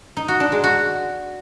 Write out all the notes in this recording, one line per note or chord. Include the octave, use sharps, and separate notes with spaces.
D#4
F#4
D4
G#3
F#4